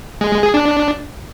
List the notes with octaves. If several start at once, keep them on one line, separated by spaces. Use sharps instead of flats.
G#3
G#3
G#4
D4